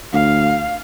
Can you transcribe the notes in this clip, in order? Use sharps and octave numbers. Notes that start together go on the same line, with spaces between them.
D2 F5